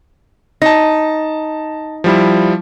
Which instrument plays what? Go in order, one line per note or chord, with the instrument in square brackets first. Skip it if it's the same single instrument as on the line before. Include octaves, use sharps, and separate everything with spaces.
[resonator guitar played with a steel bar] D#4 [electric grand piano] A5 A#6
[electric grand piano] F3 G3 E4